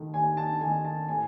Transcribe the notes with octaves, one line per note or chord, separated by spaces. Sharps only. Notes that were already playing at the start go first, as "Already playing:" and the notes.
Already playing: D#2 D#3 A3
D#2 G#5
A5
D#3 A3 G#5
A5
A2 G#5